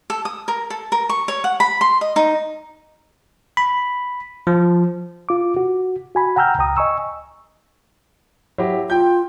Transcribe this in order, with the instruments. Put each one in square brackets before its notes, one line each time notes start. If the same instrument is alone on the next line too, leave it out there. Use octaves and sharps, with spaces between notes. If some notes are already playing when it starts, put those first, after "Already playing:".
[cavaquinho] A4
D#6
A#4
A4
A#4
C#6
C#5
F#5
B5
C6
D#5
D#4
[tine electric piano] B5
F3
[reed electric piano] F4 D6
F#4
F#4 G#5 B5
F#5 G5 A#5 E6 F6 G6
C#2 G5 A#5 D#6
D#5 G#5 C#6 E6
[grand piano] F#3 E4 G4
[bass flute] F4 [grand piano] G5 G6